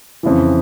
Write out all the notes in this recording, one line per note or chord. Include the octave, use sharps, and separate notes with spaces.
F2 C#3 E3